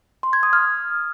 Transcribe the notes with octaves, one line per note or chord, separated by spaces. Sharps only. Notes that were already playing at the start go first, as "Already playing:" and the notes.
C6
G#6
D#6
F6